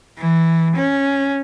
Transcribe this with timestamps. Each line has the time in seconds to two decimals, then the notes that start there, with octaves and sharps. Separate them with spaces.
0.19 E3
0.76 C#4